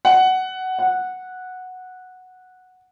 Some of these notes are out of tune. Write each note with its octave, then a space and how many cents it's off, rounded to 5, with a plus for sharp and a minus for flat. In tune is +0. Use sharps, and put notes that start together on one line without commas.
F#5 +15
F#5 -5